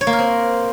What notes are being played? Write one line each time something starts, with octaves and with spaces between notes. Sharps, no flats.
C#5
A#3
A#4
C4